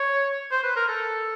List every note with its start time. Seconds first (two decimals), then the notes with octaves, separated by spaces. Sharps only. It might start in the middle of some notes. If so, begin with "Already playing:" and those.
Already playing: C#5
0.52 C5
0.64 B4
0.76 A#4
0.89 A4